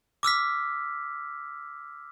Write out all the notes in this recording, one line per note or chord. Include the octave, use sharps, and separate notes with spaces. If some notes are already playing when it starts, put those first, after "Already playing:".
D6 E6 F6 B6